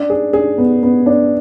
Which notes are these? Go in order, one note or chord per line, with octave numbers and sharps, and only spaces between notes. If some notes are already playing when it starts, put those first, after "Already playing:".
Already playing: D4
G#4
G#4
B3
B3
D4